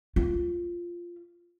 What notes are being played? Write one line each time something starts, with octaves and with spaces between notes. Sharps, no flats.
F4